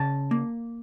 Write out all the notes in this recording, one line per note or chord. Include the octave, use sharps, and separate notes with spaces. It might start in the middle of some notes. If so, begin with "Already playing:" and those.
Already playing: C#3 A5
A#3